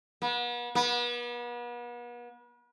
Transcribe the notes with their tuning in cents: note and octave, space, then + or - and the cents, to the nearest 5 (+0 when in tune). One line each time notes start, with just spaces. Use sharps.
B3 -40
B3 -40